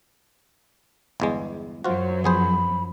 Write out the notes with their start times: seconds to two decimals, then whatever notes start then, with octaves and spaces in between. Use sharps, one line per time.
1.20 G1 E2 G#3
1.84 F#2 F#3 F4 F#4 C5
2.24 F3 B3 G#4 C5 B5